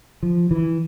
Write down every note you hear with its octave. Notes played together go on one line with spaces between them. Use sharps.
F3
E3